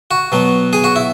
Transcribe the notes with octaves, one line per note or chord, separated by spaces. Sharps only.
F#4
B2 F#3
G#4
F#4
E4